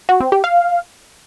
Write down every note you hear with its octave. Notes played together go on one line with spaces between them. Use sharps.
F#4
C4
G4
F5